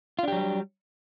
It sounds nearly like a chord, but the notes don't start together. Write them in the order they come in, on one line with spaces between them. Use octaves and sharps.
F4 D4 G4 F#3 G3